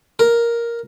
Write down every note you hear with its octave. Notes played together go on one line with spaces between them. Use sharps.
A#4